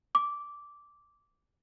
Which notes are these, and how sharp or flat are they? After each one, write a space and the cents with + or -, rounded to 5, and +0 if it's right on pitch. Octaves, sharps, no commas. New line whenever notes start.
D6 -10